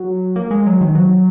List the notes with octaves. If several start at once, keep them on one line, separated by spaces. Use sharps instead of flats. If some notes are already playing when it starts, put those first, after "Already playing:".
Already playing: F#3
A#3
G#3
F#3
D#3
F#3